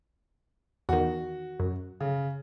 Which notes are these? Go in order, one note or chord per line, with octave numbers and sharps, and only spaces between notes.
E2 D#3 F#4
F#2
C#3